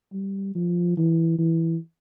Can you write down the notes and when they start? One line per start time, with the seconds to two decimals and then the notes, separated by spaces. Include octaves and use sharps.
0.13 G3
0.55 F3
0.97 E3
1.39 E3